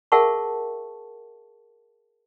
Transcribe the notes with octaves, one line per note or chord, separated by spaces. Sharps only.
G#4 A#4 E5 F#5 A5 C#6